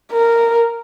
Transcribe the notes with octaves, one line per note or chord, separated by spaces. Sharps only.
A#4